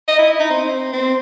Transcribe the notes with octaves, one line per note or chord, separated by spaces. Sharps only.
D#5
E4
D#4
C4
C4